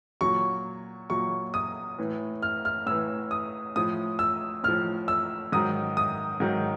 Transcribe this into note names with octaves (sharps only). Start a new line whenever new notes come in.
A#2 F#3 C#6
A#2 F#3 C#6
D#6
A2 E3
F6
F6
A2 E3 E6
D#6
A2 F3 D#6
E6
A2 F3 F6
E6
G#2 D#3 F#3 D#6
D#6
G#2 D#3 F#3